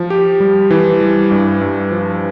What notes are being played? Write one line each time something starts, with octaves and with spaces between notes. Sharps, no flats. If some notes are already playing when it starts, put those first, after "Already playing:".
Already playing: F3
G4
G3
E3
G3
G2
G2
F3